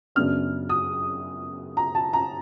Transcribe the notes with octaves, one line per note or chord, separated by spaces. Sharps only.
F#2 C#3 F#3 B3 D4 F6
D#6
A#5
A5
A#5